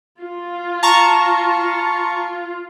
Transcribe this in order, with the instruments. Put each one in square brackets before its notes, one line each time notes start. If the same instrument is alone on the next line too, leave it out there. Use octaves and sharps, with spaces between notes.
[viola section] F4
[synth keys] A5 A#5 C#6